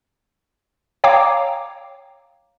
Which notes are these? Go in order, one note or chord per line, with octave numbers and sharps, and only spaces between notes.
C#5 F5 G5 A#5 D6